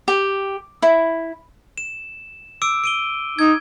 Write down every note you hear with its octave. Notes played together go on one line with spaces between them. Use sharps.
G4
E4
E7
D6 E6 D7
D7 D#7 G7
D#4 G#6